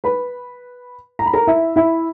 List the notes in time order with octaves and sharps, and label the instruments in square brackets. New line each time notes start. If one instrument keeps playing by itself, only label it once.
[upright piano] B4 B5
A#5
B5
A#4 A#5
E4 E5
E4 E5